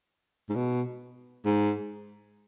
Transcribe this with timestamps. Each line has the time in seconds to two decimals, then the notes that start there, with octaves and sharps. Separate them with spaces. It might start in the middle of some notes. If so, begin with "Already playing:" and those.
0.49 G#2
0.55 B2
1.45 G#2